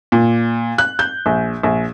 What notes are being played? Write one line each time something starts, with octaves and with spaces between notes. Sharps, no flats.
A#2
F#6
G6
A#1
A#1